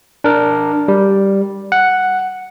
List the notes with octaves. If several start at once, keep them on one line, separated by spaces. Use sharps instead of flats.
D4 A#4
G3
F#5